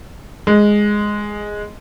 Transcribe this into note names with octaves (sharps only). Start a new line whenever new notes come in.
G#3